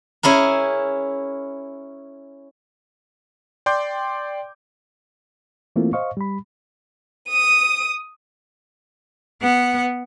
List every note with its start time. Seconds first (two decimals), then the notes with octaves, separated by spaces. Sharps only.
0.23 C#4 E4 G#4 A#4
3.66 D5 G5 C6 D6 G6
5.76 E3 A3 A#3 C4 E4 F4
5.93 C5 D#5 F5 C#6
6.17 G3 B5
7.29 D#6 D#7
9.41 B3 F#5